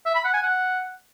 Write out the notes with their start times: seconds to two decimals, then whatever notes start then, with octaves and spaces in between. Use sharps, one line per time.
0.06 E5
0.15 B5
0.24 F#5
0.34 G#5
0.43 F#5